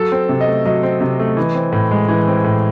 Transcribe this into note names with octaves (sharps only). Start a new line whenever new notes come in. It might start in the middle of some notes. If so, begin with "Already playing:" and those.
Already playing: F#3 A4
C4
C3
D#5
A3
F#3 D#5
C4
C3
A3
E3
C4
A2
G#3
E3
C4
A2